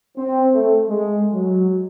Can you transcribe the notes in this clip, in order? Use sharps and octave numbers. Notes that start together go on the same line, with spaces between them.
C4
A3
G#3
F#3